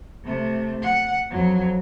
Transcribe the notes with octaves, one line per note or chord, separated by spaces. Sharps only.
C3 A3
F#5
F2 F#3